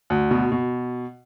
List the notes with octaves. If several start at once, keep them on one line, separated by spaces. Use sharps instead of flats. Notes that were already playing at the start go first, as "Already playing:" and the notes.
D2
B2
B2